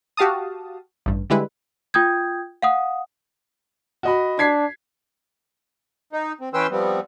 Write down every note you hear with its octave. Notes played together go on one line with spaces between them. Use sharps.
F#4 G4 F5 A5 D#6
A1 G2
D3 G3 G#3 E4 B4
F4 G5 D#6 G6 G#6
F5 F#5 D#6
F#4 D#5 B5
D4 G#6 B6 C7
D#4
C4
E3 C#4 B4 G5 C6 E6
F3 G3 B3 C4